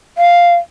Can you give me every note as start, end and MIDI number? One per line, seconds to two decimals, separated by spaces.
0.18 0.55 77